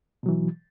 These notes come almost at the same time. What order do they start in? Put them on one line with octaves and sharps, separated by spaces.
B2 F#3 E3